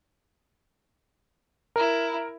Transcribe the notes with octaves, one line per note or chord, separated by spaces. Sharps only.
E4 A#4